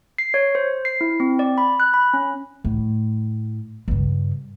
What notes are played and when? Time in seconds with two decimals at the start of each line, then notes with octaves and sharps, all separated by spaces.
0.18 C7
0.34 C#5
0.55 C5
0.85 C7
1.01 E4
1.20 C4
1.39 D5
1.58 B5
1.80 F#6
1.94 B5
2.14 C#4
2.64 A2
3.88 G2 C#3